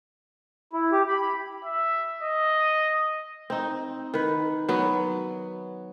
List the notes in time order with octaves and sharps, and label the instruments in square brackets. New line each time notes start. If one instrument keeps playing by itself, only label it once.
[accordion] E4
G4
B5
[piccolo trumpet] E5
D#5
[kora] C4 D#4
D#3 B4
F#3 B3